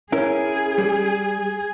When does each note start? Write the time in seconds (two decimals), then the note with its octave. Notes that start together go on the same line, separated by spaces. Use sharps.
0.12 C#4 E4 G#4 A#4
0.78 G3